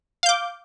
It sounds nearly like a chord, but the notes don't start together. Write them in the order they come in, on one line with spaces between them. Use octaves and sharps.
F5 G6 D6